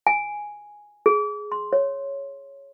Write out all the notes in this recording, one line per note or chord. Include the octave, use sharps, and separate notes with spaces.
G#5
G#4
C6
C#5